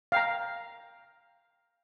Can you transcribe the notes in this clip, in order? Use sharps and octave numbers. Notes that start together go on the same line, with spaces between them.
F5 G5 A#5